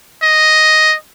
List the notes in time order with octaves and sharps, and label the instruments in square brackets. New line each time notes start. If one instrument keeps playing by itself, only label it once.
[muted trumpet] D#5